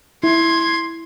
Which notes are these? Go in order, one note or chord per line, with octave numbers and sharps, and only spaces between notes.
E4 C6 G#6